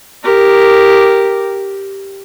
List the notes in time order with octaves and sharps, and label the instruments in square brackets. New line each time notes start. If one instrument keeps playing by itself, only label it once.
[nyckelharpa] G4 A#4